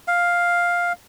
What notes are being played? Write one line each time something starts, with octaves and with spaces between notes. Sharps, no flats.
F5